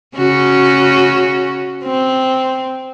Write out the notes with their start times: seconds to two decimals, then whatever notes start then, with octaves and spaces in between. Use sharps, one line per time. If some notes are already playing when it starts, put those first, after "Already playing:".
0.18 C#3 C#4 F#4
1.84 C4